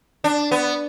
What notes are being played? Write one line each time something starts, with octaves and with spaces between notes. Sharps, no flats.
D4
B3